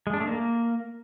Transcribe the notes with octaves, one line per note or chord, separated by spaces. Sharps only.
G#3
D4
A3
A#3